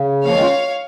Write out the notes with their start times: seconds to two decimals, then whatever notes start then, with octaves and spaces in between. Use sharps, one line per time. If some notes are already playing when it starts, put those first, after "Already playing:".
Already playing: C#3
0.25 F3 A#3 C#5 F5
0.34 D#3 G#3
0.41 C#4 F4